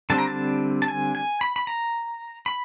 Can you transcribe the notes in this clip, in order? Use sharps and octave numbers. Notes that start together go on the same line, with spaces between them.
D3 G3 C4 A5
A#5
A5
A5
G#5
G#5
B5
B5
A#5
B5